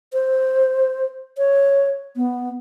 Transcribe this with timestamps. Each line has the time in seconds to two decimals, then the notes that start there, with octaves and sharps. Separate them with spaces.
0.13 C5
1.38 C#5
2.16 B3